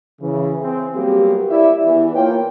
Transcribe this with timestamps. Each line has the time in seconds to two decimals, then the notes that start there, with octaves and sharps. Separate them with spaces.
0.21 C#3 E3
0.61 C4 G#4
0.95 F#3 G3 A#3 B3 G4
1.51 E4 D5 E5
1.85 E2 E3
2.15 A#3 F4 C#5 G5